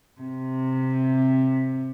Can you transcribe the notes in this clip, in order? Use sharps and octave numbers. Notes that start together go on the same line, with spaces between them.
C3